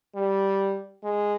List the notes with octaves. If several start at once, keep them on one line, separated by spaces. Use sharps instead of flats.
G3
G#3